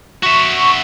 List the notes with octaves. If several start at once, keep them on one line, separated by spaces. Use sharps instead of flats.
F#4 E5 C#6